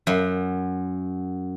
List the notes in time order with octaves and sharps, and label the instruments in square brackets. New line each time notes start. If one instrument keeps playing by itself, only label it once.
[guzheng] F#2